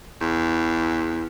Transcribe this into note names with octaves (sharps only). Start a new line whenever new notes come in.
E2